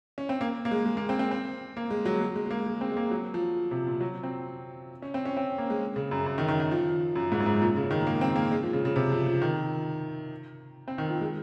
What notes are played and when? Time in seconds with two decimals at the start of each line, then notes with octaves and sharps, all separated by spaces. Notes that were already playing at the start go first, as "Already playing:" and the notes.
0.18 C#4
0.29 C4
0.41 A#3
0.65 A#3
0.71 G#3
0.86 G#3
0.97 A#3
1.09 C4
1.19 C4
1.31 C4
1.77 A#3
1.90 G#3
2.05 F#3
2.21 G#3
2.36 G#3
2.46 G#3
2.50 A#3
2.66 G#3
2.81 C4
2.92 G#3
2.97 A#3
3.11 F#3
3.34 F3
3.71 C3
3.87 A#2
4.01 F#3
4.23 C4
5.02 C#4
5.14 C4
5.25 C#4
5.37 C4
5.58 A#3
5.70 G#3
5.96 C#3
6.11 F#2
6.26 F#2
6.38 D#3
6.48 D#3
6.60 D#3
6.71 F3
7.16 F#2
7.32 G#2
7.40 F#2
7.46 G#2
7.62 A#2
7.77 C#3
7.91 D#3
8.01 G#3
8.07 A#3
8.21 C4
8.36 A#3
8.51 G#3
8.63 F3
8.73 C#3
8.85 C#3
8.96 C3
9.12 F3
9.26 F3
9.42 D#3
10.88 C4
10.98 D#3
11.09 F3
11.21 G#3